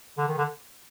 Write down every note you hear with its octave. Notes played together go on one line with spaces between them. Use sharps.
D3
D#3
D3